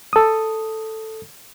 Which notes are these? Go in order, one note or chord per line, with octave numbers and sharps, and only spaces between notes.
A4 D#6